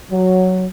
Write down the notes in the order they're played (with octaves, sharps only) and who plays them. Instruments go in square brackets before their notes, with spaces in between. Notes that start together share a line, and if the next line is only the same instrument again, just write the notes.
[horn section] F#3